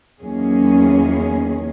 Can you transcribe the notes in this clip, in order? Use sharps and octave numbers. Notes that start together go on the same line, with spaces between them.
E2 D#3 F#3 A#3 C#4 G#4